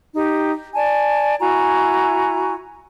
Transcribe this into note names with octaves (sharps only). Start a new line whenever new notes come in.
D#4 G4
D5 G#5 A5
E4 F#4 G#5 A#5